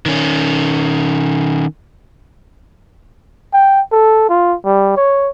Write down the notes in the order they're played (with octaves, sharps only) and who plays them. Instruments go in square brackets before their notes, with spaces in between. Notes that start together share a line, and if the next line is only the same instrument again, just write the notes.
[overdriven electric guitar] D#3 C#4
[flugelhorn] G5
A4
F4
G3
C#5